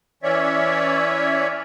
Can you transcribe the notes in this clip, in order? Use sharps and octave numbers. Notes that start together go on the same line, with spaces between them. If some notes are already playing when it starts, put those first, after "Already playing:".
E3 C#4 C#5 D5 E5